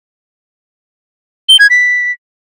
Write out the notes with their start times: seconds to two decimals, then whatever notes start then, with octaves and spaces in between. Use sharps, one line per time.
1.49 G7
1.59 G#6
1.70 B6